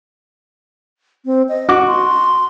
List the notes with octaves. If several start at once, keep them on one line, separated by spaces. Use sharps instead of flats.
C4
D#5
F#4 C#6 D6
C6